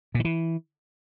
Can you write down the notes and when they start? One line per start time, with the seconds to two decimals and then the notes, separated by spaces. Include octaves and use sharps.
0.15 A#2
0.20 D#3
0.25 E3